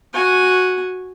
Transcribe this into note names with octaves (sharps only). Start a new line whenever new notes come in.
F#4 G#5